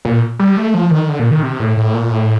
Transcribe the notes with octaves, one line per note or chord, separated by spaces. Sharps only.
A#2
G3
A3
F3
D#3
D3
A#2
D#3
C3
A2
A2
A#2
A2